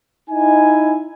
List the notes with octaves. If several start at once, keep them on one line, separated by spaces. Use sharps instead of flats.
D#4 E4 G#5